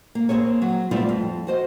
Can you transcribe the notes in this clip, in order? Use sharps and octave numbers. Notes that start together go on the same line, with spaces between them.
A#3
A#3 C4 G#4 C#5
F#3
G3 A3 B3 C4 E4 F4
F2
F#4 C5 D#5